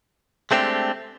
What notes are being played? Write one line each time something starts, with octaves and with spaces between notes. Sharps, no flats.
G#3 A3 C4 D4 G4